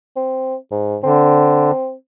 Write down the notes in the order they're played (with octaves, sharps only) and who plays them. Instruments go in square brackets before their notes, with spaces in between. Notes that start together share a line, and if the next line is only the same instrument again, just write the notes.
[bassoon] C4
G#2
[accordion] D3 [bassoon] C4